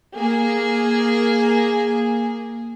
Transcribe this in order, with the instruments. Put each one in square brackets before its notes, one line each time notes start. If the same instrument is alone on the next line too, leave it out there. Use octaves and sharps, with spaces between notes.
[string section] A#3 G#4